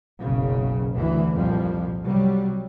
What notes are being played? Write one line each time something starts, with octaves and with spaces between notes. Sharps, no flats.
F#1 B1 C#3
D2 E3
C2 F2 A#2 F3 G3
C3 F#3 G3